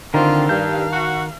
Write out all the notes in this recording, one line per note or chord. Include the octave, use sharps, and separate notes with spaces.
D3 D#3 C4 D4 F4 A#5
G2 F5 A5 G6
F#4